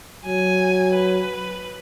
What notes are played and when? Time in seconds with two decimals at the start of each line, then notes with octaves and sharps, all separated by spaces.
0.25 F#3 G#5
0.94 B4